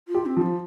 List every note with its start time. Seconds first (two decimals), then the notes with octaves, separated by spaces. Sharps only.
0.08 F4
0.15 G4
0.26 C4
0.37 F3 F4